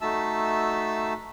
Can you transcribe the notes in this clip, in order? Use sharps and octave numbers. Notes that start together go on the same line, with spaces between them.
A3 D#4 F#4 E5 A5 E6